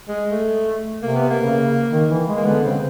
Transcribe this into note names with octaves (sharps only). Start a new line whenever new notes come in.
G#3
A3
C3 A#3
B3
A#3
C#3
D#3
E3
G#3
A#3
D3 B3
C#3 C4